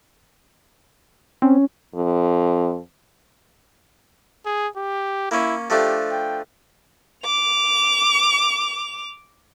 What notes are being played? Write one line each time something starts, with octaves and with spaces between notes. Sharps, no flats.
C4 C#4
F2
G#4
G4
A#3 C#4 E4
F3 A3 D4 G4
G5
D6 F7